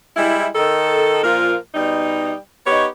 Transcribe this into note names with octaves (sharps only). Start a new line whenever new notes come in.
G3 G#3 E4
D#3 A4
A#2 F3 A#3 F4 A#4
B2 G3 D#4
B3 D#4 G4 C#5